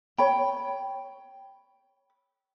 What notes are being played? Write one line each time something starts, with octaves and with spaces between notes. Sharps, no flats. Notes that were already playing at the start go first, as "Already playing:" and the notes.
C#5 G5 B5